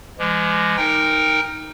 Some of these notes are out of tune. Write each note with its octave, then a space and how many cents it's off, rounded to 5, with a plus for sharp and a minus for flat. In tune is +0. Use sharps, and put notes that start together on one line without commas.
E3 +40 G#3 -15
D#4 +0 A#4 +0 G5 +20